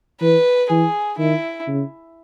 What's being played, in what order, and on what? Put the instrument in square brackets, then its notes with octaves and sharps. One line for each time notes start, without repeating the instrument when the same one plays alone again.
[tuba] E3 [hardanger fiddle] B4
[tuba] E3 [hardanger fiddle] G#4
[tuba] D#3 [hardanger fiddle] E4
[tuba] C#3